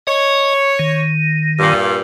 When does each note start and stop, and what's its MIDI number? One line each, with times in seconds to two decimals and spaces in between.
0.07 1.04 73
0.07 0.54 75
0.79 1.73 51
1.59 2.02 43
1.59 2.02 46